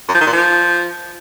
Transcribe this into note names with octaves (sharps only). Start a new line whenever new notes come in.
F#2
F3
D#3
A#2
F3